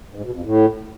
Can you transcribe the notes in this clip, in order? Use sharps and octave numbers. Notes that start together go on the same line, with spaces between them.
G#2
B2
F2
A2